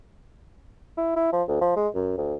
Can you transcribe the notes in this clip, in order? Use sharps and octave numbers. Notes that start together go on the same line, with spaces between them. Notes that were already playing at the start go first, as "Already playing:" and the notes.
E4
E4
F3
D2
F3
G#3
F#2
D2